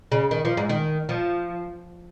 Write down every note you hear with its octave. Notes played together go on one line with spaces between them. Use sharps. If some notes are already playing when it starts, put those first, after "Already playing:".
C#3
D#3
F3
G#2
D#3
F3